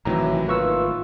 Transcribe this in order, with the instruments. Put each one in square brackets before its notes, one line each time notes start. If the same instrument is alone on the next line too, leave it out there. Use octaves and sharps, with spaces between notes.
[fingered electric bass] G#1 A2 D#3 [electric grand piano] C3 F#3 [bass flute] E3 [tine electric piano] A#5
[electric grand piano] A3 A#3 F5 [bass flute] F4 [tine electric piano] B4 C#6 E6